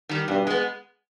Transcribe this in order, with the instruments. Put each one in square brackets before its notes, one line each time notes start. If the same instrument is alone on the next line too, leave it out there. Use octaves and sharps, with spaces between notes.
[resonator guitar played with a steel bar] D#3 G3
[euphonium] G2 [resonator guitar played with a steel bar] B2
[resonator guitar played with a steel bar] G#3 B3